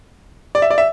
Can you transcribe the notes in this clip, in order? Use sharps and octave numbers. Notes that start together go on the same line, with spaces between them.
D5
E5
D5
E5